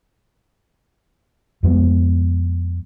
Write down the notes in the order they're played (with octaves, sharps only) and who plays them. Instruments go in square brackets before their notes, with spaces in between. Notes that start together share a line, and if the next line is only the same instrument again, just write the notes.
[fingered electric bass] F2 G#3 A#3 B3